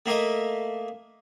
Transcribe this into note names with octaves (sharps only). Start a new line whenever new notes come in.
A3 A#3 D#5 E5